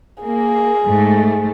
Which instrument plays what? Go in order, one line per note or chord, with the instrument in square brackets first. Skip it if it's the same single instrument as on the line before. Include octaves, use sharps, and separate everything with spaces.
[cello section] A#3 [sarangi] G#4
[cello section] G#2 A3